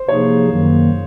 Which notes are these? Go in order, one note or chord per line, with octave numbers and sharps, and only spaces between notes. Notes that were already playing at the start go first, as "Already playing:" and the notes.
Already playing: C5
C3 F3 A#3 D#4 G#4 C#5
F#2 D#3 F#3 A#3